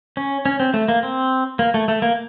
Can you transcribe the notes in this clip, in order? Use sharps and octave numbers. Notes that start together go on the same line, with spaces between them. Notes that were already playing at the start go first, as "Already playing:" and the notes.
C#4
C#4
C4
A3
A#3
C4
A#3
A3
A3
A#3